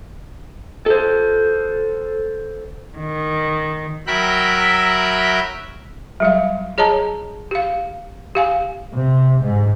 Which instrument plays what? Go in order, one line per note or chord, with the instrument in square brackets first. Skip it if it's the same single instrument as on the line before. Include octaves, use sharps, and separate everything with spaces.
[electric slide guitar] A4 C5
[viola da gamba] D#3
[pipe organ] F#3 A#4 E5 G5 B5 F#6
[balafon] F#3 G3 F5
G#4 C#5 D#5 A5 A#5
G4 F5
G4 F5 G#5
[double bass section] C3
G#2